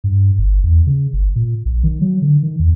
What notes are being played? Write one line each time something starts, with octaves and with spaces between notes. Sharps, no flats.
G2
G1
E2
C#3
G1
A#2
A#1
D#3
F#3
D3
D#3
E2